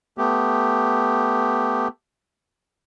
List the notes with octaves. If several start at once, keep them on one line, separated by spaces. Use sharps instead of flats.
A3 B3 G4